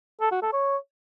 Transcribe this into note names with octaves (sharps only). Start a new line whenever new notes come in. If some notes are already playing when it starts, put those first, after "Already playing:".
A4
F#4
A4
C#5